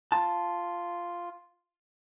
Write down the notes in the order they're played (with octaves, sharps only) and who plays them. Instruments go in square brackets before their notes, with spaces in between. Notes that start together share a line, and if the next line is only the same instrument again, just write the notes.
[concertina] F4 [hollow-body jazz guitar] A5